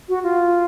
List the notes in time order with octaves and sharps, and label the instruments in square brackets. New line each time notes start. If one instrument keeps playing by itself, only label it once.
[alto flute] F#4
F4